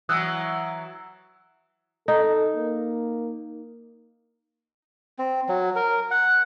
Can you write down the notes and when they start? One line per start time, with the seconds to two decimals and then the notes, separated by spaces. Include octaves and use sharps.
0.09 E3 F#3 D#6 E6 F#6
2.08 D#4 A4
2.56 A#3
5.19 C4
5.49 F#3
5.76 A#4
6.11 F#5